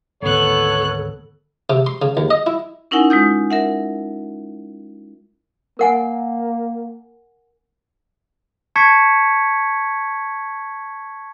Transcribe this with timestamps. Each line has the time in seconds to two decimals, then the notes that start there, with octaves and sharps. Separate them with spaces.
0.22 G#1 D2 B3 A4 C#5 F#6
1.70 C3
1.86 C6
2.02 C#3
2.17 D#2
2.30 D#5
2.47 E4
2.91 C#4 D#4 E4 A#4 F#5 G#5
3.10 G#3 F4 D#6 G6
3.50 A#4 E5 F#5
5.79 A#3 A#4 F#5 G#5
8.76 A5 C#6 G#6 B6 C#7